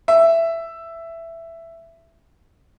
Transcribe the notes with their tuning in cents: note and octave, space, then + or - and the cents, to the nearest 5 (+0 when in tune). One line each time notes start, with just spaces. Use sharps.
E5 +10